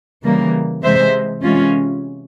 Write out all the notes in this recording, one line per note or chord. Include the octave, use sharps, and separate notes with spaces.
C#3 E3 G3 A#3
C3 E3 G#3 C5 E5
C3 E3 G#3 C#4 F4